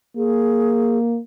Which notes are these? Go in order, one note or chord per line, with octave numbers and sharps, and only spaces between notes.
A#3 G#4